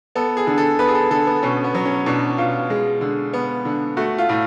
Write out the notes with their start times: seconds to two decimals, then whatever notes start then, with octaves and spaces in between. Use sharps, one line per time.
0.15 B3 A4
0.37 G#4
0.47 D3
0.58 A4
0.79 B3 B4
0.88 G#4
0.95 A4
1.11 D3 A4
1.27 B3
1.43 B2 C#4
1.64 B3
1.75 F#3
1.85 C#4
2.06 B2 D4
2.38 B2 F4
2.70 G#3
3.01 D3
3.33 B3
3.65 D3
3.97 A3 F#4
4.18 F4
4.29 A2